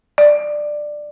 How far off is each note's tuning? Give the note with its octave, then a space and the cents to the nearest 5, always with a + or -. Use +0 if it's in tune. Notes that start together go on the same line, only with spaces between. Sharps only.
D5 +15